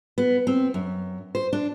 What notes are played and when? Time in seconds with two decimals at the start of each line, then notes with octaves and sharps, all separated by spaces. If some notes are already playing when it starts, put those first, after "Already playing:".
0.18 B3
0.47 C4
0.74 F#2
1.35 C5
1.53 D4